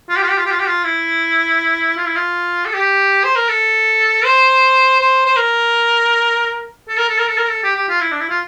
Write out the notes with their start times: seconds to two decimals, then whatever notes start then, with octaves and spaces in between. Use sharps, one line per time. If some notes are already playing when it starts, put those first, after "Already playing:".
0.09 F4
0.17 G4
0.23 F4
0.30 G4
0.38 F4
0.46 G4
0.52 F4
0.60 G4
0.67 F4
0.84 E4
1.97 F4
2.06 E4
2.16 F4
2.66 A4
2.74 G4
3.24 C5
3.36 A#4
3.49 A4
4.25 C5
5.00 C5
5.26 C5
5.37 A#4
6.89 A4
6.98 A#4
7.09 A4
7.19 A#4
7.28 A4
7.38 A#4
7.49 A4
7.64 G4
7.76 G4
7.89 F4
8.01 E4
8.11 D4
8.20 E4
8.30 F4